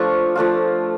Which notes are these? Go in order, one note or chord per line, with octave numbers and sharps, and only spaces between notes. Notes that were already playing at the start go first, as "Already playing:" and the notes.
Already playing: F3 A3 D4 F4 C#6
F3 A3 D4 F4